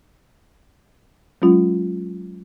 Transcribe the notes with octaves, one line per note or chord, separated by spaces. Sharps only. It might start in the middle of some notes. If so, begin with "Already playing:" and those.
F#3 G#3 C#4 F4